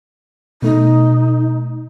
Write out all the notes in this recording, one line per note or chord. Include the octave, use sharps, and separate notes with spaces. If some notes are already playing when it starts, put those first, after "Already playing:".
B2 A3 D#4